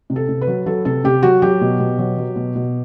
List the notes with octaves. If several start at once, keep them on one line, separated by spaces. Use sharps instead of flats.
C3
A4
C3
B4
F#3
F#3 A4
C3 A4
C3 G4
F#3 F#4
F#3 G4
B2
B2
F#3
F#3
B2
B2